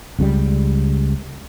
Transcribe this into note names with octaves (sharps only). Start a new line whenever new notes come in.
C#2 C#3 F3 G3